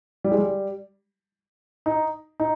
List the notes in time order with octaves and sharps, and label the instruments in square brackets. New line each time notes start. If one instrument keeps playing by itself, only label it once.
[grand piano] G3
G#3
G3
D#4
D#4